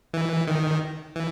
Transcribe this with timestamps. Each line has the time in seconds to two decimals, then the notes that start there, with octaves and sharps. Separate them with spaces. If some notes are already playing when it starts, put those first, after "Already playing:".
0.14 E3
0.47 D#3
1.16 E3